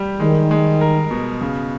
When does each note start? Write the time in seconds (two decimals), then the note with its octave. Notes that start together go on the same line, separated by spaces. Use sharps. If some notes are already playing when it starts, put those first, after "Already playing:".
Already playing: G3 G4
0.20 D#3 G#3
0.51 G#3
0.81 A#4
1.11 B2
1.41 C#3